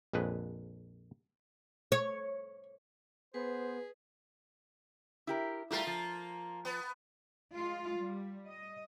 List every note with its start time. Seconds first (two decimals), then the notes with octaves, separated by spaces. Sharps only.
0.13 A#1 F2 G#3 B4
1.92 C#5
3.34 B3 G#4 B4 C5
5.27 E4 G4 A#4
5.71 G3 A3 A#3 E4 F4 A#4
5.87 F3
6.65 B3
7.54 G#3 F4
7.97 G3
8.48 D#5